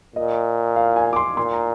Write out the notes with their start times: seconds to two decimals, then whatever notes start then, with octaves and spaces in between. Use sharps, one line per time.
0.16 A#2 D#5
0.76 F5
0.96 G#5
1.13 D6
1.16 C6
1.37 A#2 C6
1.53 A#5